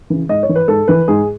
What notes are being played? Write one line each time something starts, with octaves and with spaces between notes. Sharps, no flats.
C#3 E3
G#2 D#5
C#5
E3
B4
G#2 A4
E3 B4
G#2 G#4